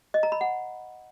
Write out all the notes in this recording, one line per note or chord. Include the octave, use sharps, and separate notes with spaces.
D#5
A#5
B5
F#5